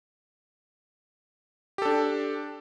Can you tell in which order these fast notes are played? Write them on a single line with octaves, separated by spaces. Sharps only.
G4 A4 D4